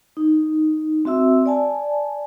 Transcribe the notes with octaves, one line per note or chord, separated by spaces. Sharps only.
D#4
C4 F#4 E5 E6
D5 G#5 A5